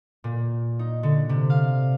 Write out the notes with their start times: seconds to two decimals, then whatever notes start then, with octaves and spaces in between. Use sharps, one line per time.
0.24 A#2
0.79 D#4
1.03 D3
1.29 C3
1.50 F5